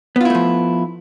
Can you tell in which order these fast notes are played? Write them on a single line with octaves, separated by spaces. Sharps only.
B3 F4 E4 A3 F3